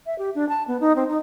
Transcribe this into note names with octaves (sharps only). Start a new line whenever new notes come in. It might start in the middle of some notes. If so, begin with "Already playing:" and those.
E5
G4
D4
A5
B3
D#4
C4
D#4